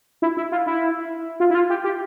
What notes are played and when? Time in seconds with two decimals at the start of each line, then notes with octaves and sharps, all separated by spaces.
0.22 E4
0.37 E4
0.52 F4
0.66 E4
1.40 F4
1.50 E4
1.55 F4
1.70 G4
1.84 G4